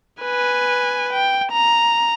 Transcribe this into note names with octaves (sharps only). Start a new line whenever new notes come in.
B4 G#5
G5
A#5